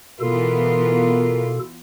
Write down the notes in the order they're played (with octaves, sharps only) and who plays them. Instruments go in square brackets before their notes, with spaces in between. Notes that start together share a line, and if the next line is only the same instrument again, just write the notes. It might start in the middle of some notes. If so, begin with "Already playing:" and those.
[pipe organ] B2 A4 [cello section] E3 B3 F4 [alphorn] A#4